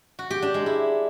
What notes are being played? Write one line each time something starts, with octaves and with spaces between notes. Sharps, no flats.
F#4
G4
D4
G#3
E4